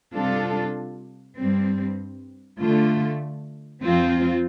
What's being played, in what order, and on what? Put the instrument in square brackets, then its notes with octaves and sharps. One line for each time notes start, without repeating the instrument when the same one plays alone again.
[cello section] C3 G3 D4 F4 A4
G2 G3 C4
D3 A3 F4
F2 F3 C4 F4